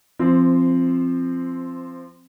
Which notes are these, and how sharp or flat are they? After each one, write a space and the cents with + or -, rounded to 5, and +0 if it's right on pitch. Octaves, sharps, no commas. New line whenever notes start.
F3 -20 C4 +0